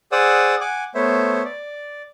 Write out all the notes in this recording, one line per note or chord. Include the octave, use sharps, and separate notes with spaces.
G#4 C5 D5 F#5 D#6 E6
F#5 G#5 D6
A3 B3 C5 C#5 E5
D5